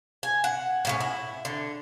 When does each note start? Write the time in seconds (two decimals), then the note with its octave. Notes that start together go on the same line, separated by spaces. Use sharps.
0.23 G#5
0.44 F#5
0.85 A2 A#3 C#4
1.01 E4
1.45 D3